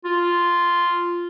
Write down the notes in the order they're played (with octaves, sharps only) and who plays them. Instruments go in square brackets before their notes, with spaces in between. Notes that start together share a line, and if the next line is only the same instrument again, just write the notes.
[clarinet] F4